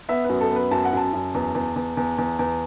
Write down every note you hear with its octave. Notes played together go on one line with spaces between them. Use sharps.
B3 E5
F#2 B4
A4
B3
B4
F#2 A5
F#5
F#2 A5
F#2
E2
E2
E2
E2
E2
E2